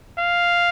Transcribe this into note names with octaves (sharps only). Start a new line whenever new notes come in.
F5